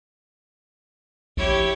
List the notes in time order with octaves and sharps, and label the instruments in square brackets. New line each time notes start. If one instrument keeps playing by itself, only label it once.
[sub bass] A#1 [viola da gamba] E4 G4 C#5